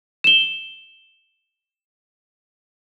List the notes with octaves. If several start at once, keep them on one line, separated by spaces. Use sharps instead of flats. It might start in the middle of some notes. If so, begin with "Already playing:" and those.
E7 G7